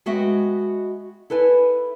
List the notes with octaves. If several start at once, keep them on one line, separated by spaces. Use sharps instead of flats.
G#3 B3 F#4 D#5 E5 G5
E4 A4 B4 G#5